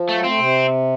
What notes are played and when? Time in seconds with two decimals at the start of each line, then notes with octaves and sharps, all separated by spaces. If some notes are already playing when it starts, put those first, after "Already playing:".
Already playing: F3
0.09 F#3 A3
0.24 A3 C4
0.38 C3